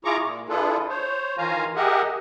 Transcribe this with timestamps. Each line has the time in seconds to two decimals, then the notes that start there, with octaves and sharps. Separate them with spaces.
0.05 E4 F4 G#4 A#5 C#6 D6
0.25 A#2
0.49 D4 E4 F4 G#4 A4 B4
0.89 C5 C#5
1.38 D#3 E3 F4 F5 G#5 A#5
1.76 G4 G#4 A#4 D#5 E5 F#5